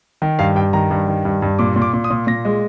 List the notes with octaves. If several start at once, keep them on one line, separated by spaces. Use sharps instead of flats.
D#3
G2 F5
G2 G5
D#3 A#5
G2
D#3
G2
G2
A#2 D6
A#2
D6
A#2
D#6
A#2
A#2 A#6
G#3